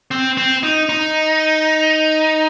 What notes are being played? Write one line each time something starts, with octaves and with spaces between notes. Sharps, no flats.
C4
C4
D#4
D#4